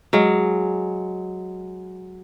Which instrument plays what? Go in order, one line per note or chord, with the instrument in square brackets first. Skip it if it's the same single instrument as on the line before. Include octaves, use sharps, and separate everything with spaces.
[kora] F#3 G#3 F5